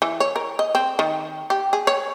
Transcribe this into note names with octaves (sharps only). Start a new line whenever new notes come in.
E3
C#5
A#4
D#5
C4
D#3
G4
G#4
C#5